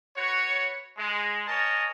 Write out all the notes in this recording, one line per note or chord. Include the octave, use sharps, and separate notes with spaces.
F#4 B4 C#5
G#3
A#4 C#5 D#5 G#5 A5